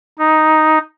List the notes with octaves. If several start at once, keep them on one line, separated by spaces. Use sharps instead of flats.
D#4